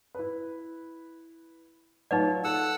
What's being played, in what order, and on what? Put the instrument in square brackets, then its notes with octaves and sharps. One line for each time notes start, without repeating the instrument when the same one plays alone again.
[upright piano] E4 B4
[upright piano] F#3 F4 F#4 [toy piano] D#4 B4 D5
[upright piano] A4 [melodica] F#5 E6